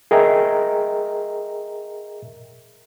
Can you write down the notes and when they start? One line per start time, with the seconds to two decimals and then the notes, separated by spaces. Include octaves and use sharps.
0.11 G#4 A#4 D#5 E5 G5 A#5